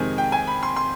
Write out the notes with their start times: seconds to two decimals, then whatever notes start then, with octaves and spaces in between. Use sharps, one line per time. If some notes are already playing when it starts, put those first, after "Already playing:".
Already playing: F2 C3 D#3 G#3 G#5
0.18 G5
0.32 G#5
0.47 B5
0.63 C6
0.76 C6